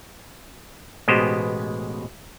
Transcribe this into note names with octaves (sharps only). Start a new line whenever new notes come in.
A1 B2 G#3 B3 G4 C5